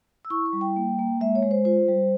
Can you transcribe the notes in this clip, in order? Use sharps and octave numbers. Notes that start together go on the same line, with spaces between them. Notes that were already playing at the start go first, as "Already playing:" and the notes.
E6
E4 C#6
C#6
G3
G5
A#3
A#3
G#3 E5
C#5
G#3
C5
F4 C5
G3